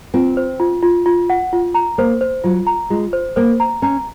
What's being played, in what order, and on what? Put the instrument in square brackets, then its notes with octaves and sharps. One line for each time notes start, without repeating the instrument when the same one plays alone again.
[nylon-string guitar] C4 [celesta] F4
[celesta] C5
F4
F4
F4
F#5
F4
A#5
[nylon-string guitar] A#3 [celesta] C5
[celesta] C5
[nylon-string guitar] F#3 [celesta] F4
[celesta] A#5
[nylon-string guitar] G#3 [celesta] F4
[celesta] C5
[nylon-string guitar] A#3 [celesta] C5
[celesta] A#5
[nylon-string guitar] C#4 [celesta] A#5